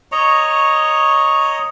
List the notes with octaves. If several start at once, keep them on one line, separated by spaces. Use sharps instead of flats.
C#5 D#5 A#5 C#6